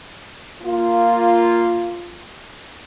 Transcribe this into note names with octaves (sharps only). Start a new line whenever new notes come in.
A#3 F4